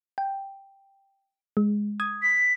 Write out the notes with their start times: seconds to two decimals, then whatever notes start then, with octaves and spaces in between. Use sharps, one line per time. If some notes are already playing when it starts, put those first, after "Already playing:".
0.18 G5
1.57 G#3
2.00 D#6 G#6
2.22 B6